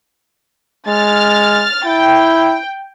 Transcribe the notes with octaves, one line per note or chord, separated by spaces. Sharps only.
G#3 F6 A6
E4 G5